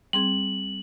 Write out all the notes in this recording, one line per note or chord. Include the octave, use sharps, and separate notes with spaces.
G3 C4 G#4 F#7